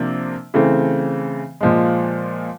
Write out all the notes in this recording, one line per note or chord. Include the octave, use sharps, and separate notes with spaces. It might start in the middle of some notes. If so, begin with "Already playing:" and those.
Already playing: C3 F3 A#3 D4
C#3 E3 A3 C4
A#2 F3 G#3